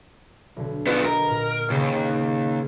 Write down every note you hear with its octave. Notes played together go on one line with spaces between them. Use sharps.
B1 D3
F3 B3
G4 A#4 B4 D#5
A#2
D#2 C#3 B4